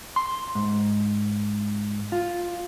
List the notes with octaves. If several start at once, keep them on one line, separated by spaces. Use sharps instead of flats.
C6
G#2
F4